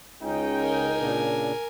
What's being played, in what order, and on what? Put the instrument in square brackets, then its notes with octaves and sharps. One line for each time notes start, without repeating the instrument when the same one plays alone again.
[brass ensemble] C#2 D#4 G5 [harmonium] C#3 C#4
[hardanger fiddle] A#4 G#5
[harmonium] A#2 C#3 D4